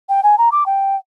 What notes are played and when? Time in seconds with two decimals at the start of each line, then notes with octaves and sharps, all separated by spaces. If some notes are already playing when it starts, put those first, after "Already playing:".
0.09 G5
0.23 G#5
0.38 A#5
0.52 D6
0.66 G5